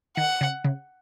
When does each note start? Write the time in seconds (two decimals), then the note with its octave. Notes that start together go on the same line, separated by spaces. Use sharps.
0.17 D#3 F#5
0.41 C#3
0.64 C#3